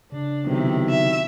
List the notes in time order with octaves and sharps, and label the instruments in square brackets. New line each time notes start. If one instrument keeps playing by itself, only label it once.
[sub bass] C#3 [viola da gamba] D4
[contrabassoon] B1 [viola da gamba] C3 D#3 E4
[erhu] E5